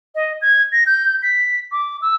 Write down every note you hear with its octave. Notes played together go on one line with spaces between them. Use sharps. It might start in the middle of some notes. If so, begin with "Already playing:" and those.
D#5
G#6
A#6
G6
B6
D6
E6